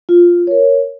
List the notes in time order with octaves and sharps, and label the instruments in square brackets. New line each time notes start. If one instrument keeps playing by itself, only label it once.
[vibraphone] F4
A#4 C#5